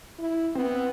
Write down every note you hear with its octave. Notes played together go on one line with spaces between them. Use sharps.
E4
B3 C4